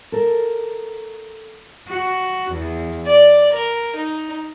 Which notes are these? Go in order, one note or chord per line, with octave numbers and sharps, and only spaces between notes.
A4 A#4
F#4
E2
D5
A#4
D#4